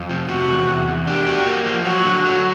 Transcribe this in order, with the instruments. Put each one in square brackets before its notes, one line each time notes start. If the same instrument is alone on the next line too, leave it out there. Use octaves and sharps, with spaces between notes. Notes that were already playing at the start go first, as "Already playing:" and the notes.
Already playing: [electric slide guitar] F2
C3
[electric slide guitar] C3 [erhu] F#4
[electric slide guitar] E2
E2
E2
[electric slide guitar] D4 [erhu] G4
[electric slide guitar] F#4
A#3
F3
[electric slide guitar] F#3 [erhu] F#4
[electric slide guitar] D3
F#3